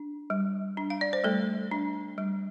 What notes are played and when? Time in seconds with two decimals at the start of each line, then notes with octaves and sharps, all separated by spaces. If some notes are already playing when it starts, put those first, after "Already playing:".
Already playing: D4
0.30 G3
0.77 D4
0.90 F5
1.01 D5
1.13 C5
1.24 G3 A3 A4
1.71 D4
2.18 G3